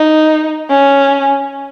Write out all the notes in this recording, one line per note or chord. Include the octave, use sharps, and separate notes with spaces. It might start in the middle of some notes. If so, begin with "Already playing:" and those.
Already playing: D#4
C#4